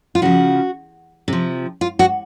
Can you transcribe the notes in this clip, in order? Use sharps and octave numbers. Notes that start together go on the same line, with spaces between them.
F4
C#3 F3 F#4
C3 F3
F4
F#4